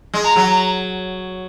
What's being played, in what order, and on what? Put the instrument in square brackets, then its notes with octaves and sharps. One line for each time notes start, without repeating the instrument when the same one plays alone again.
[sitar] G#3
[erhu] A#5
[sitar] F#3